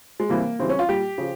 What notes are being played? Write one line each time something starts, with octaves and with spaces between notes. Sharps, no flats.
G#3
C3 E3 G3 A#3
C#3 E3 G3 C4
C#4
F4
A#2 G3 G4
C#3 F3